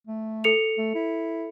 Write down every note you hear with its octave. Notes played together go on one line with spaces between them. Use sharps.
A3
A4 C#7 F7
A3
E4